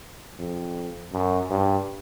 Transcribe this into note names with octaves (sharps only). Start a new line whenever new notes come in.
F2
F#2
G2